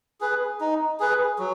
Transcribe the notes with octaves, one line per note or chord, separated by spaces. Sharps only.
G#4 B4
D#4
G#4 B4
F#3